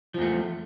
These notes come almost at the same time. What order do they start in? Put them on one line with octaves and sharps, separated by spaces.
F3 E2 A3